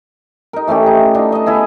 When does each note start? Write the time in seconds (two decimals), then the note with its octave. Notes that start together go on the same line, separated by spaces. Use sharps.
0.53 D#4 A#4
0.68 E3 A3 C#4 G4
0.86 D#4
1.14 D4 D#4 F4
1.32 D#5 A5
1.46 B3 E4 G#4 D#5